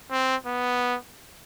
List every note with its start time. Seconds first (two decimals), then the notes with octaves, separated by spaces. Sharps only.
0.11 C4
0.47 B3